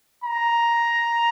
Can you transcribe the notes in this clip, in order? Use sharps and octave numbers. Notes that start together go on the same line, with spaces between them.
A#5